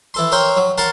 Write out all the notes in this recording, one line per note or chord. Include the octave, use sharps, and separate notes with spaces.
E3 A4 C6
A#4 C5 C#5 G5 C6
F#3
A#4 F#5 A5 C6